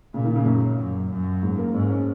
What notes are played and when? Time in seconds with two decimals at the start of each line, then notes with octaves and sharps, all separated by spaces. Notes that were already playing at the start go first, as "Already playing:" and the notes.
0.14 A#2 C#3
0.25 D#3
0.36 C#3
0.46 F#2
0.78 F#2
1.10 F#2
1.43 G#2
1.58 A#3
1.74 G#2 C#4
1.90 C#4